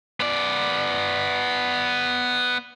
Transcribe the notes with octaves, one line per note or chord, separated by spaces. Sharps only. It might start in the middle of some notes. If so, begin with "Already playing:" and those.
B3 D5